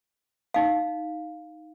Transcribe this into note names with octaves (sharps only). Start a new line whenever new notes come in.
D#4 F5